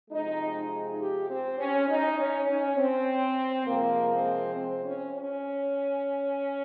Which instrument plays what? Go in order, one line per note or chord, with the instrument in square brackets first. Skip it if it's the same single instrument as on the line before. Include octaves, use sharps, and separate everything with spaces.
[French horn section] C3 F3 G#3 D#4
G4
C4
C#4
D#4
C#4
C#4
C4
C3 F3 G#3 A#3
C4
C4
C#4
C#4